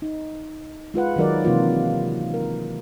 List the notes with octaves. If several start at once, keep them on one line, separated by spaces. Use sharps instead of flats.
D#4
G#3 F4 B4 F#5
D#3 F#3 D#4 A#4 D5
C3 E3 A#3 F4
A#4